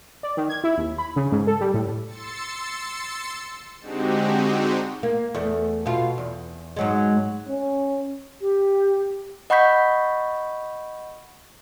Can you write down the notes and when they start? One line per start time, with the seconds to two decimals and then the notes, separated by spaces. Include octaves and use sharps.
0.23 D5
0.37 D#3
0.49 G#6
0.64 E4
0.78 D#2
0.98 B5
1.16 C#3
1.32 G#2
1.47 A4
1.61 G3
1.74 A2
2.07 C6 E6 A6 C#7
3.80 D3 G#3 C4 D#4 F#4 G4
5.03 A#3
5.34 E2 A3
5.86 B2 F4
6.18 E2
6.76 G#2 F#3 G#3
7.49 C#4
8.41 G4
9.50 D#5 F#5 B5 C#6 G6 B6